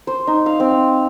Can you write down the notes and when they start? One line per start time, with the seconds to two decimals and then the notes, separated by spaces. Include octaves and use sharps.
0.07 C5
0.27 D#4
0.46 F5
0.60 C4